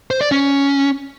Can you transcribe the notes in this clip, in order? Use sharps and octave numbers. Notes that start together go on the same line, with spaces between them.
C5
D5
C#4